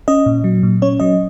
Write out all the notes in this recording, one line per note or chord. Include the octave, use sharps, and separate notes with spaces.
C#4 D#5
A#2
F#3
A#2
C#4 C#5
F#3 D#5